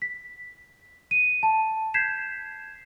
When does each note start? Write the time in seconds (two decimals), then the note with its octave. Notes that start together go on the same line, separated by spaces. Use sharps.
0.02 B6
1.11 D#7
1.43 A5
1.94 G6 G#6 B6 C7 E7